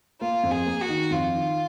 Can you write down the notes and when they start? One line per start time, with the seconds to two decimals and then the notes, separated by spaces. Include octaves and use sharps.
0.21 A#3 F4
0.43 F2
0.51 G#4
0.66 A#3
0.81 F#4
0.89 D#3
1.11 F2 F4
1.34 D#3